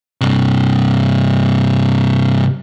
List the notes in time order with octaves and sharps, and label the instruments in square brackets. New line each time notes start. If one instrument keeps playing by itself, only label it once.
[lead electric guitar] G2 C3